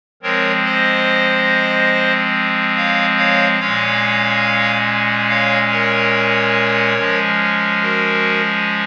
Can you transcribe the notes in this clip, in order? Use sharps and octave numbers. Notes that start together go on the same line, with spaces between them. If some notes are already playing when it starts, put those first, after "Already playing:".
F3 G#3 C4 A#4 C#5
C5 D#5
C#5 F5
C#5 F5
A#2 G#3 C#4 C#5 F5
C#5 F5
A#4 C#5
F3 G#3 C#4
F#4 A#4